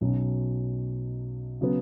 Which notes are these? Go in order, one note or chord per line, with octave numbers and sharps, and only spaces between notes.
B1 B2 F#3 C#4
C#3 F#3 B3